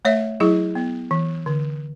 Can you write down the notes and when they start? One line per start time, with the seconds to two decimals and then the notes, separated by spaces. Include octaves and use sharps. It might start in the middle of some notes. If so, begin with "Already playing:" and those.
0.05 A3 C#5 E5
0.40 F#3 E4 G#4
0.75 B3
1.11 E3
1.46 D3